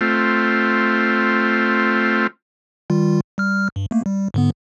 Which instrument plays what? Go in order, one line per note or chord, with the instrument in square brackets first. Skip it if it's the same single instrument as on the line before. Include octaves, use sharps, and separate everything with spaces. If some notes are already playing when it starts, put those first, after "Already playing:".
[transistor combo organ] A3 C4 F4
[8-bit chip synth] D#3 G3 F4
G3 F6
G2
A3 A#3
G3
G#2 D3 B3